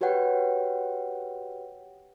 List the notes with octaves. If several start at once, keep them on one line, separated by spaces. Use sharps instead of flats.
F#4 G4 B4 C#5 F#5 G5